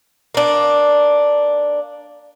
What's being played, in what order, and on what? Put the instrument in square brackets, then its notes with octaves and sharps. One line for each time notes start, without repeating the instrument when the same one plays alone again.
[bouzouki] A#3 D4